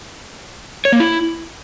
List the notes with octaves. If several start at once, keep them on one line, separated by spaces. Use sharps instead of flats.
C#5
A#3
E4